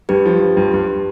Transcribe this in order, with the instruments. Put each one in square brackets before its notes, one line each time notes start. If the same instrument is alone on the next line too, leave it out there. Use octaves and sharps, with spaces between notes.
[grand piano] G2 [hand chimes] G4 B4
[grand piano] F3
F3
G2
G2